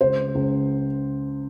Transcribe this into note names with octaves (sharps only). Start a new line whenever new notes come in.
C#2 C5
C#2